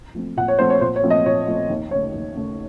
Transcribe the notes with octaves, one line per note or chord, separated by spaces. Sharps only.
F3 A3 C4
A#2 F#5
C#5
F3 A3 C4 C5
C#5
A#2 C5
C#5
F3 A3 C4
D#5
A#2 C#5
F3 A3 C4
D#2
C#3 A3 C#5
D#2
C#3 A3